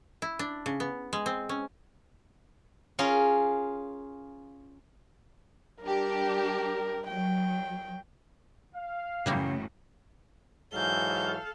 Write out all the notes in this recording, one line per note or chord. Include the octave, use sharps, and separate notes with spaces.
E4
D4
C#3
B3
G#3
C4
C#4
C#4 F4 G#4 A#4
G3 D4 G4 A#4
F#3 G5
F5
F#2 A2 C#3 E3 G3 A#3
G#2 E3 F#3 A4 F5 G6